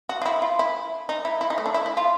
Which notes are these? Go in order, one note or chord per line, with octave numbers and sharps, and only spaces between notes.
F#4
F4
E4
F4
E4
D#4
E4
E4
D#4
A3
D4
E4
E4
F4